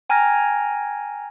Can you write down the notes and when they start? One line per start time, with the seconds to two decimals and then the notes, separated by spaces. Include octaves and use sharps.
0.10 G5 G#5 A#5 F6 G#6 A#6